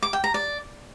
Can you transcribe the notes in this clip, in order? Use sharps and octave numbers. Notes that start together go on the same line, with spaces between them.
D6
G5
A#5
D5